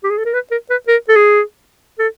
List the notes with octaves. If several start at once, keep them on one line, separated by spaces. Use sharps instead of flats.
G4
G#4
A4
A#4
B4
A#4
B4
A#4
A4
G#4
A4